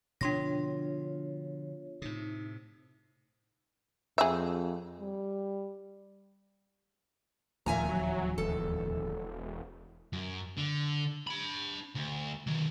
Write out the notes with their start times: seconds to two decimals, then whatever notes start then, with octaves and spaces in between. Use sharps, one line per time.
0.21 B2 D3 F3 D4 F4 C#5 C6 A#6
2.02 A2 C3 D#4
4.18 F2 G#4 E5
4.99 G3
7.66 D1 D#2 A#2 F3 E5 G#5 A#5
7.89 F#3
8.38 E1 A4
10.13 F#2
10.57 D3
11.27 D4 B5
11.96 D2
12.47 D#3 F#3